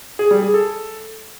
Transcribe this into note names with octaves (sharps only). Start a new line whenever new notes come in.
G#4
G3
G#4
A4